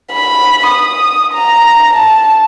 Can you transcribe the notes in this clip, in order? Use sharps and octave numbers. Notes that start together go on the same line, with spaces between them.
B5
D#6
A#5
A5